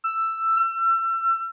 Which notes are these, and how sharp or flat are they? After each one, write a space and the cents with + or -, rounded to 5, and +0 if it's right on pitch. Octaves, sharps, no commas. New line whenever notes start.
E6 +10
E6 +35